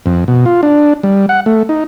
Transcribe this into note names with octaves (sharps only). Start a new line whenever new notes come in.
F2
B2
F4
D4
G3
F#5
A3
D#4